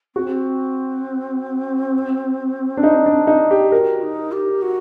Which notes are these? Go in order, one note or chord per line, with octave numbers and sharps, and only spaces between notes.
C4 F#4
D4
D#4
D4
D#4
G4
F#4 A#4
D#4
G4
F#4